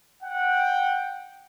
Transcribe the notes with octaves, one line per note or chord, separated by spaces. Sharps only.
F#5 G5